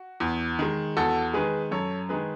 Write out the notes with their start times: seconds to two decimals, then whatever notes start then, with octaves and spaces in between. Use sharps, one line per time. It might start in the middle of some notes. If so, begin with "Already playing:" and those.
Already playing: F#4
0.20 E2
0.59 D#3 G#3
0.97 E2 F#4 A4
1.34 D#3 G#3 G#4 B4
1.71 F#2 A4 C#5
2.09 D#3 G#3 G#4 B4